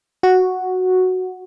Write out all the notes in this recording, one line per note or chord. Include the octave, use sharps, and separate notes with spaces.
F#4